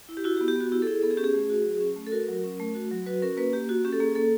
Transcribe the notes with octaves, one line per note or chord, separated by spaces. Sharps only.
E4
G4
E4 F#4
G4
B3
G4
B3 F#4
E4 G4
A4
E4 G#4
B3 A4
G#4
C#4 G4
G#4
A3
F#4
F#3
C#4
A3
A4
F#4 A#4
F#3
C#4
A3
F#4
F#3
F#4 B4
C#4 A#4
A#3 B4
A#3 G4
F#4
C#4 G4
A4
A#3 G#4
A#3 A4